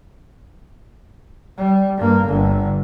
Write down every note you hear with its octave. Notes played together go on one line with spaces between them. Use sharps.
G3
G2 A#3
G1 D3